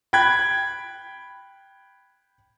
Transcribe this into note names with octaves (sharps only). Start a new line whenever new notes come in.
G5 B5 F#6 G#6